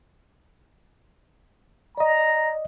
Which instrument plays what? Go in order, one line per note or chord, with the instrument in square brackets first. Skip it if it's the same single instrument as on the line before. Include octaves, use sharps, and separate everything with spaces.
[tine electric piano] D5 D#5 [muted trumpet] A#5